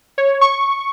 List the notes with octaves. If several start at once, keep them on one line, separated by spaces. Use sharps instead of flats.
C#5
C#6